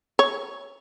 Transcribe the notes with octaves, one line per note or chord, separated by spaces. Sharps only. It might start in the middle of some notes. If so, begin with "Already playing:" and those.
C#5